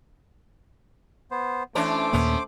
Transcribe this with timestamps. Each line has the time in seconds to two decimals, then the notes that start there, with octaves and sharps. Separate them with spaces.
1.31 B3 C5
1.75 E3 A3 C#4 D4 C5 D6
2.13 D#2 A#2 A#3 B3 C#4